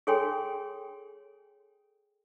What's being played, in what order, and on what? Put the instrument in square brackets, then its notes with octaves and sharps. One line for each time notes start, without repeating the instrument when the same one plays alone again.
[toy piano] G#4 A4 C#5 G5 G#5 C6